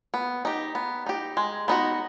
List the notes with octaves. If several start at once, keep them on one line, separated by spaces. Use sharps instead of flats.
B3
D#4 G4
B3
D#4 G4
G#3
B3 D#4 F#4